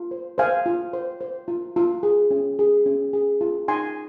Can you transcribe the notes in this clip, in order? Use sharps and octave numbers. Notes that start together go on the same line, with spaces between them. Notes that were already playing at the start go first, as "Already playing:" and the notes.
Already playing: F4
C5
C5 F5 G#5
F4
C5
C5
F4
F4
G#4
C#4
G#4
C#4
G#4
F4
D#4 G#5 C6